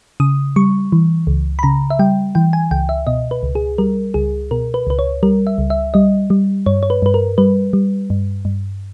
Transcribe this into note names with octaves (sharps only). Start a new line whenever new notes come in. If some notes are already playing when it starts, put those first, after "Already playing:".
C#3 D#6
G3 C#6
E3
C#2
B5
C#3 A#5
E5
G3 G5
E3 G5
G#5
C#2 G5
E5
B2 D#5
B4
C#2
G#4
G3 A#4
C#2 G#4
B2 A#4
B4
C#2 B4
C#5
G3 A#4
E5
C#2
E5
G3 D#5
G3
G2 C#5
C#5
B4
G2 B4
A#4
G3 B4
G3
G2
G2